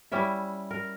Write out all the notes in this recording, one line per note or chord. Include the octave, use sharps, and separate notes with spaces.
G3 C#4 E4 E5
A#4